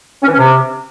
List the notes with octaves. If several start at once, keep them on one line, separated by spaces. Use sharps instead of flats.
C#4
E3
C#4
C3